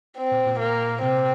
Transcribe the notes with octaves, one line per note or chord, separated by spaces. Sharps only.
C4
A#2
A#2
A#3
C3 C4